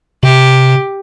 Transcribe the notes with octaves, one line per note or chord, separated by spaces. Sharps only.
C3 G4